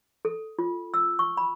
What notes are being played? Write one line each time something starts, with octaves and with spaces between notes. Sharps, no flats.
A4
F4
E6
C#6
B5